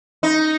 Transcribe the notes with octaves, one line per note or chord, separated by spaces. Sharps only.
D#4